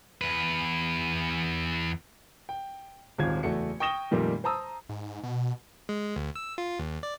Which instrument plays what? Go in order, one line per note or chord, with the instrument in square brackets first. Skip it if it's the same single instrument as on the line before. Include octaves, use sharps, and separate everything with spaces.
[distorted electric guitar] E2 B4
[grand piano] G5
D#1 G#1 F4 G#6
F#1 E2 A3 F#4 C#7
G5 C#6 D#6 A#6 E7 G7
F2 A#2 D#3 G3 A3
C5 A5 A#5 D#6 E6
[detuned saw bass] G#2
B2
[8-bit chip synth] G#3
D2
E6
F4
D#2
D5